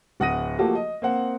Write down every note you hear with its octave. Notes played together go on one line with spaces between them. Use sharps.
D1 F#5 D#6 A#6 D#7
F3 A3 A#3 F#4 G4 A4
D#5
A#3 C4 F#5